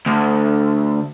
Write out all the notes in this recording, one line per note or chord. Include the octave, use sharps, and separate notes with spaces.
D2